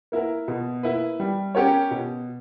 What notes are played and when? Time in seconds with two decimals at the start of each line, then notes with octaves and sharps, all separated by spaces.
0.12 A#3 E4 A#4
0.48 B2
0.83 A#3 E4 B4
1.20 G3
1.55 C#4 G4 A#4 C#5
1.91 B2